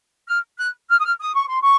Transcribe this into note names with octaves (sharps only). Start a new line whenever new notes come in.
F6
F#6
F6
D#6
F6
D#6
C#6
C6
C#6